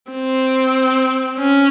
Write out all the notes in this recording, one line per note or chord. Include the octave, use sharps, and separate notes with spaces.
C4
C#4